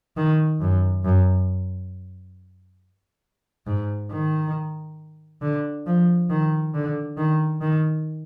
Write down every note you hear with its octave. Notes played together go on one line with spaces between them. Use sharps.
D#3
F#2
F#2
G#2
D#3
D3
F3
D#3
D3
D#3
D#3